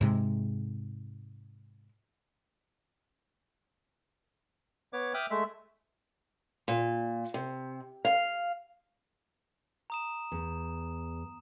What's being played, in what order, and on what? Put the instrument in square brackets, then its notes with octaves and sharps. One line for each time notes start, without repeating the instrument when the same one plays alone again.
[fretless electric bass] G#2 C3 G#3
[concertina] B3 B4 C#5 D6
E5 G5 D6 D#6 F6 F#6
G#3 A3 E5
[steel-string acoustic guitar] A#2
C3
F5
[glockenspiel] A#5 D#6 E7
[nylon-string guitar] E2